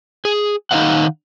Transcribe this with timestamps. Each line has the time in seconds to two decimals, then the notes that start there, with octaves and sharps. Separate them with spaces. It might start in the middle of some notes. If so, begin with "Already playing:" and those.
0.25 G#4
0.71 D#3 D#4 G#4 D#5 F5 F#5